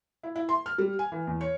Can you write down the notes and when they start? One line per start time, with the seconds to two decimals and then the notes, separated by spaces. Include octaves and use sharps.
0.23 E4
0.36 E4
0.49 C6
0.66 F6
0.78 G3
0.99 G#5
1.12 E3
1.27 E2
1.41 C#5